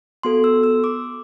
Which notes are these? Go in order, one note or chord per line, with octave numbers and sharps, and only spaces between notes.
B3 F#4 A4 C6
E6
E6
D6